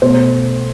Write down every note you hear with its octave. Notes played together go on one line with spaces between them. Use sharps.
B2 A3 C5